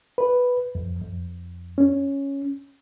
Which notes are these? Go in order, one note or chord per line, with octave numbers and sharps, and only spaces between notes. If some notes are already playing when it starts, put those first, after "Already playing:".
B4
F2
F2
C#4